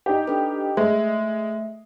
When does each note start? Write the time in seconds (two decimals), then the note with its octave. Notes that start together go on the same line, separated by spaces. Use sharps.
0.06 D#4 G4
0.27 D4 A4 B4
0.77 G#3 A3 E5